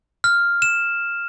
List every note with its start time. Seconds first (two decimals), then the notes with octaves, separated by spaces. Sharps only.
0.24 F6
0.62 E7